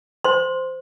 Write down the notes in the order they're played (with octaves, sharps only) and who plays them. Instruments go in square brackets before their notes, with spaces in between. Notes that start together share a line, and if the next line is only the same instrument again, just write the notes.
[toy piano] C5 C6